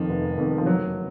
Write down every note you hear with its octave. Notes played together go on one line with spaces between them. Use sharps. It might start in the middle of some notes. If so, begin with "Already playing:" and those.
Already playing: F2 D#3 F3
F1
F2 D#3
F3
F#1 F#3